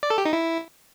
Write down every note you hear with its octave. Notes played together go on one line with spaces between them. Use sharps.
D5
A4
G4
D#4
E4